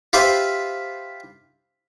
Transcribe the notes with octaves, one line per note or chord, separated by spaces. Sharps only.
F4 G4 B4 C5 E5